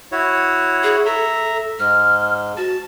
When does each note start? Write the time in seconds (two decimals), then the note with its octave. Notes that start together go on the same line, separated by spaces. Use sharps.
0.12 E4 F#4 C#5
0.83 G#4
1.06 A4 E5 A#5
1.79 G#2 F6
2.57 F#4 A5